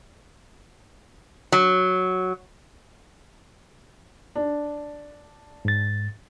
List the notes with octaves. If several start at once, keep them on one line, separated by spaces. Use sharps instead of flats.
F#3
D4
G#2 A6